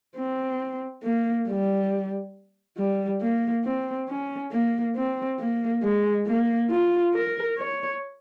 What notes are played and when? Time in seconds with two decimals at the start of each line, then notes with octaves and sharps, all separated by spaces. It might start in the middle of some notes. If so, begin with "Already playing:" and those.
0.16 C4
1.04 A#3
1.48 G3
2.78 G3
3.22 A#3
3.65 C4
4.09 C#4
4.52 A#3
4.96 C4
5.40 A#3
5.83 G#3
6.27 A#3
6.70 F4
7.14 A#4
7.58 C#5